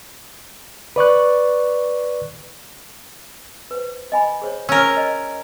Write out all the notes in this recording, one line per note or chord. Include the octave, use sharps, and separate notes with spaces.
B4 D5 C#6 F#6
B4 C5
D#5 G#5 B5
G#4 C5 C#5
C#4 A#4 C#5 E6
D#5